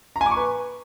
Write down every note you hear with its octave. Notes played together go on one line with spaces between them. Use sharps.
A#5
G#5
D6
C#6
B4